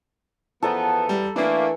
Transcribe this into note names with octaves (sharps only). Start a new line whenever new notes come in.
E2 F3 B3 A4 A5 A#5
G3
E3 A3 A#3 D4 E4